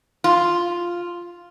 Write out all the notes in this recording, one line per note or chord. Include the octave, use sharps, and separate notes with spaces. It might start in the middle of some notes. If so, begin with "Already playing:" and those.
F4